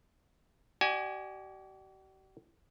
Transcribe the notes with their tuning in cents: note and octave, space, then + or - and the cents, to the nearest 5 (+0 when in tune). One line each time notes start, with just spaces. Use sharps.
G4 -45 D5 +30 G#5 +0